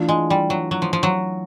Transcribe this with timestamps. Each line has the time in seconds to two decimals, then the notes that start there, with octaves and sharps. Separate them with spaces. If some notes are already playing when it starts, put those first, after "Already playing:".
Already playing: E3 A3 D4 F4
0.09 G#3
0.30 G3
0.50 F#3
0.71 F#3
0.82 F3
0.93 F3
1.03 F#3